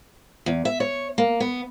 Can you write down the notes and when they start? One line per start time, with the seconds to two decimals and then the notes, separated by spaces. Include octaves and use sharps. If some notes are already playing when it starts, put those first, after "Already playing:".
0.46 E2
0.65 E5
0.80 C#5
1.18 A#3
1.40 B3